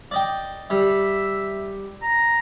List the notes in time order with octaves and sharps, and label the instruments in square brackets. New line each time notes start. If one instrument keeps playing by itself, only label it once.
[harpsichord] D5 D#5 G5
[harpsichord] G3 [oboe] E5
[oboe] A#5